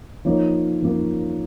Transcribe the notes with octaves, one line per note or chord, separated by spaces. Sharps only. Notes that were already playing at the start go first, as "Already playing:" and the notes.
F3 A#3 D#4 C#5
F3 A#3 D#4